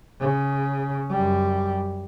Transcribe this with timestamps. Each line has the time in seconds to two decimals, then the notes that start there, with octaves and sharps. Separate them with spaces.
0.20 C#3
1.10 F#2 G3